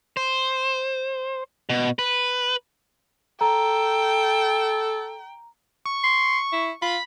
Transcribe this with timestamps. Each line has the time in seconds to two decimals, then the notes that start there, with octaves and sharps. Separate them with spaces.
0.17 C5
1.69 B2
1.99 B4
3.41 A4 G5 A#5
5.85 C#6
6.04 C6
6.53 E4
6.82 F4 B5